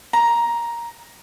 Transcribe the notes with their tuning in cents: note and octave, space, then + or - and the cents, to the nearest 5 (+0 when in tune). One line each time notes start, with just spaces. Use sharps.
A#5 +10